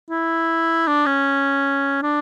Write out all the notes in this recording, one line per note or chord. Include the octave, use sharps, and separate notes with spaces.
E4
D4
C#4
D4